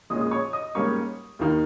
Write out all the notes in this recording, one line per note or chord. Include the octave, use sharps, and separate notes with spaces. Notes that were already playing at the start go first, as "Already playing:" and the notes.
A#1 A#2 G#3 C#4 D#5 D#6
D#6
C#5 C#6
D#5 D#6
G#2 G3 A#3 C#4 C#5 C#6
D#2 D#3 A#3 D#4